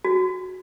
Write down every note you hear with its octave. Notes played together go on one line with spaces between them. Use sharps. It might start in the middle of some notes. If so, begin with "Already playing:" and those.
F#4